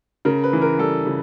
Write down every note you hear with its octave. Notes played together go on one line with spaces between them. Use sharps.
C#3 A#4
B4
E3
A#4
G3 A4
C#3